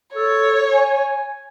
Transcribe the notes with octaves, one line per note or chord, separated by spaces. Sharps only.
A4 C#5
G#5